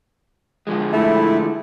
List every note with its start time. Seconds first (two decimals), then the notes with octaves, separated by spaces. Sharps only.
0.67 D3 F3 G#3
0.93 A3 E4